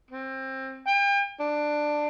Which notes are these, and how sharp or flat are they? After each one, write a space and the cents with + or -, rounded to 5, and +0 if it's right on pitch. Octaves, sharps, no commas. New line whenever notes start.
C4 +20
G5 +40
D4 +15